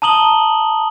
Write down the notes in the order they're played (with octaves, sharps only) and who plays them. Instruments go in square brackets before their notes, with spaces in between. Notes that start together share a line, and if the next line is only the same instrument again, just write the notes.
[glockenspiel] A5 A#5 D#6 F#7 G7